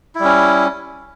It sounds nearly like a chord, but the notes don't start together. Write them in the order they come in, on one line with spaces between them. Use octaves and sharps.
E4 G3 C#4